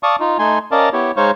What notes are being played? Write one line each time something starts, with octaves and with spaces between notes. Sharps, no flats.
D5 F5 A5 C#6 D#6
D#4 F4
A3 D#4 G#5 C6
C#4 A#4 D5 D#5 F5 A5
B3 E4 G4 C#5
G#3 D#4 C5 C#5 F5 C#6